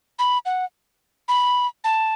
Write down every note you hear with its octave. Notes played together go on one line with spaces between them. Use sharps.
B5
F#5
B5
A5